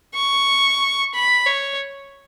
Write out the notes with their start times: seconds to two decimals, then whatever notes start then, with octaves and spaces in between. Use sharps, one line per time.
0.15 C#6
1.14 B5
1.46 C#5